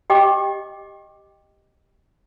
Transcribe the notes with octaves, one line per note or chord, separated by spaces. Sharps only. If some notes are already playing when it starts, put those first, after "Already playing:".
G4 D#5 G5 D6